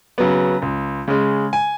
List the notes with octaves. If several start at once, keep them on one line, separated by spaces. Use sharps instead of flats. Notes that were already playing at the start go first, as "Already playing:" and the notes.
C#3 F#3 B3
C#2
C#3 G#3
G#5